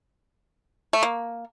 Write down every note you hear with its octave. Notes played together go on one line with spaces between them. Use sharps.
A3
A#3